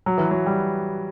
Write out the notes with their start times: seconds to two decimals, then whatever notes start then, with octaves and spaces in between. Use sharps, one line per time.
0.06 F#3
0.18 E3
0.31 F#3
0.46 G3